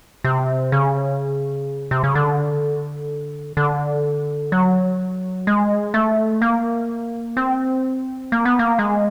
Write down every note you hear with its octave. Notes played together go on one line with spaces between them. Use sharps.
C3
C#3
C3
C#3
D3
D3
F#3
G#3
A3
A#3
C4
A#3
B3
A#3
G#3